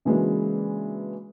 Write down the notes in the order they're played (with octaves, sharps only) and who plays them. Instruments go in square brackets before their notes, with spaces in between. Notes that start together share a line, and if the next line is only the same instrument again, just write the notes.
[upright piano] C#3 E3 F#3 G#3 A#3 D4